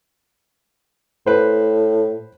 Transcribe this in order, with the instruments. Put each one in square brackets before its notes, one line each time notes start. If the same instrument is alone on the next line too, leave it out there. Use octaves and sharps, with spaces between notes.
[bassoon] A2 [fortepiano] B4 C5